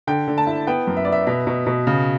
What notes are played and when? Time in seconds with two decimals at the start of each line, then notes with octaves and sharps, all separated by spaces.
0.07 D3 G5
0.28 D3
0.38 A5
0.47 E4
0.67 B3 G5
0.87 F#2
0.97 E5
1.05 B3 D5
1.12 E5
1.27 B2 E5
1.47 B2
1.67 B2
1.87 C#3